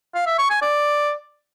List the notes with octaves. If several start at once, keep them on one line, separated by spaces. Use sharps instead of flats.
F5
E5
C#6
G#5
D5